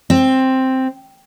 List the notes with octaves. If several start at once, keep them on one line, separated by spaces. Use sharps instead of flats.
C4